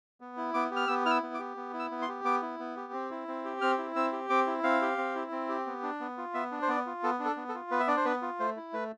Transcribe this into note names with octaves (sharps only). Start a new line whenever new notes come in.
B3
E4
B3 D6
G4
F6
B3 E6
E4 E6 F6
B3
D6
G4
B3
E4
E6
B3
C6
G4
B3 D6
E4
B3
G4
C4
E4
C4
G4
C4 F6
E4
C4 E6
G4
C4 D6
E4
C4 F5
G4
C4
E4
C4
G4
B3
D4
B3
F4
B3 E5
D4
C5
B3 D5
F4
B3 A4
D4
A4
B3
A4
F4
B3 B4
E5
D4 D5
C5
B3 B4
F4
A3 C5
E4
A3 B4